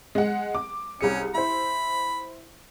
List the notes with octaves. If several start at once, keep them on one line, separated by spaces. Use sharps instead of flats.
G#3 F#5
D6
C2 C#4 G#4 C#7
E4 C5 B5